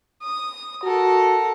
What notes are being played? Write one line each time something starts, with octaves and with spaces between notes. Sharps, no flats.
D#6
F#4 A4 A#4